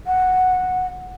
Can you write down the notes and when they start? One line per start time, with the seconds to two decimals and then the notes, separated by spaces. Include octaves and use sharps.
0.07 F#5